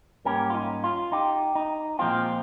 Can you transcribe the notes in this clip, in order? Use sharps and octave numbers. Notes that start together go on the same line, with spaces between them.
G#2 G3 A#3 C#4 G4 A#4
F4
D#4
F4
D#4 G4
D#4
A#2 F3 G#3 C4 F4